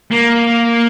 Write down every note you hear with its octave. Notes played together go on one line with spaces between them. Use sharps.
A#3